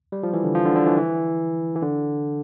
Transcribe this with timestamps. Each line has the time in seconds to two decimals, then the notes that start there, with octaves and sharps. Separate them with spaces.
0.12 G3
0.23 F3
0.33 E3
0.44 D3
0.55 F3
0.65 D3
0.76 D3
0.86 E3
0.97 E3
1.75 E3
1.82 D3